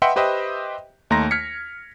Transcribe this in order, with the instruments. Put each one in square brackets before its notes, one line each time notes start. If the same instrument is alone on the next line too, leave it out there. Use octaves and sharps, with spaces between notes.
[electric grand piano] B4 D#5 E5 F#5 G5 C6
G4 B4 C5 D#5 E5 G5
D#2 A3 D#4 A#5 C6 A#6
F6 G#6 B6 C#7